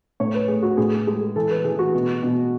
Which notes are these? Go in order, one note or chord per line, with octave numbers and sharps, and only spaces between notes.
A2 C#5
B4
A3 G#4
F#4
A2 G#4
G#3
E3 A4
B4
E3 G#4
F#4
B2
B2